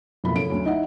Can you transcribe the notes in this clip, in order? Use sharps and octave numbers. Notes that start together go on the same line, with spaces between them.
F#1 F2 B2 E4 B5
C#3 A3 D7
D2 F#3
D#4 E4 D#5 E5 F#5